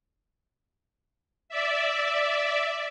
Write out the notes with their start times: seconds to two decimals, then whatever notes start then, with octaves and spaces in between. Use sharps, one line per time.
1.49 D5 E5